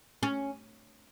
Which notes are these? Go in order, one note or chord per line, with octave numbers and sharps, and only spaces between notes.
C#4